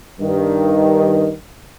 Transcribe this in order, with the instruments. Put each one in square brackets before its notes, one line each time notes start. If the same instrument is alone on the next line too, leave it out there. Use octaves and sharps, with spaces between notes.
[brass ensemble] G2 D#3